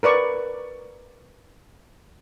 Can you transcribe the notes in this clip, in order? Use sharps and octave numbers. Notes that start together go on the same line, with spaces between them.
A#4 B4 D5 C#6